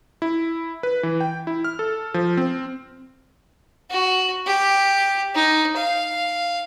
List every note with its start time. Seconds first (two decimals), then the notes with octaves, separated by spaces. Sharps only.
0.22 E4
0.83 B4
1.03 E3
1.20 G5
1.47 E4
1.64 F6
1.79 A4
2.14 F3
2.37 C4
3.90 F#4
4.47 G4
5.35 D#4
5.77 F5